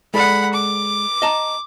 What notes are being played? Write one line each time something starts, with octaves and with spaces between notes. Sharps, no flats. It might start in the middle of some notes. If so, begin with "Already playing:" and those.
G#3 A4 D5 F#5 B5
D6
D#5 A5 A#5